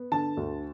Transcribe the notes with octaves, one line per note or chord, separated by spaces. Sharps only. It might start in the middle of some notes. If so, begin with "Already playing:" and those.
Already playing: B3
D3 A5
D2